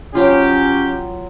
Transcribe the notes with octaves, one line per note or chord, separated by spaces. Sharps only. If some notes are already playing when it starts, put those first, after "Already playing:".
F#3 C#4 F4 G4